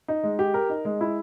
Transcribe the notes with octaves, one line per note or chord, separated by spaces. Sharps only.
D#4
G#3
G4
A#4
D#4
G#3
E4